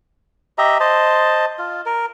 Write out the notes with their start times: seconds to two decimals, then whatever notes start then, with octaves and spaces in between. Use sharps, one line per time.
0.58 G4 D#5 E5 A#5
0.80 C5 D#5 A5
1.59 F4
1.86 A#4